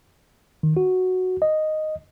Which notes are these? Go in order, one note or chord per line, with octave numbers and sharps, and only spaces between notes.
D#3
F#4
D#5